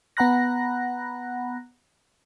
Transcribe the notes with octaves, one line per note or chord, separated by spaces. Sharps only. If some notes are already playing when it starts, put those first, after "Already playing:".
B3 F#5 A#5 B5 F#6 A#6